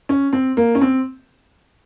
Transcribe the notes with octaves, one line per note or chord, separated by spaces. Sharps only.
C#4
C4
A#3
C#4
C4